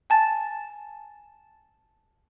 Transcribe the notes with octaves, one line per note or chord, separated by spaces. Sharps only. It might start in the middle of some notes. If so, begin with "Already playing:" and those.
G#5 A5 A6